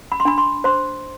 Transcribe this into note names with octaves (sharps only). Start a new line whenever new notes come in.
B5
C6
D4 B5
C6
C5 C6